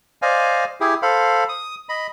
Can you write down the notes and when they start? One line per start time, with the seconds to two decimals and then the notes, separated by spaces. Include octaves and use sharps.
0.22 C5 D5 D#5 F5 G#5
0.80 E4 G4 G#4
1.02 A4 C5 F5 B5
1.49 D#6
1.89 D#5 B5